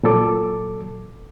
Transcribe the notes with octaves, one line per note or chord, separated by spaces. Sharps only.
A#2 F#3 A4 D6